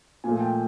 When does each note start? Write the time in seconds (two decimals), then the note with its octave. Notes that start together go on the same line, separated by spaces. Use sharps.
0.24 A#2 F3 A3 G#5
0.40 G5